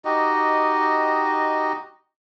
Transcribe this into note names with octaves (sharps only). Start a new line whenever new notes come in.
D#4 F#4 G4 D#5